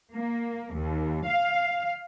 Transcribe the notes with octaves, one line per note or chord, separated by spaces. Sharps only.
A#3
D#2
F5